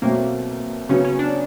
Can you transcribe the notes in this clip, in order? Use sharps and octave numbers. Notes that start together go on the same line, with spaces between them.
B2 F#3 A3 A#3 C4
C#3 F#3 B3 C#4
C#4
D4